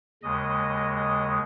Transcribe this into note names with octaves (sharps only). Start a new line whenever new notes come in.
D#2 C#3 G#3 D#5
D#5